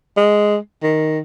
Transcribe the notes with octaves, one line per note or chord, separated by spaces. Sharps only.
G#3
D#3